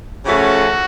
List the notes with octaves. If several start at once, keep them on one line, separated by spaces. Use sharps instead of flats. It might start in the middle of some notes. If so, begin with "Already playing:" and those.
C#3 F3 A3 C#4 F#4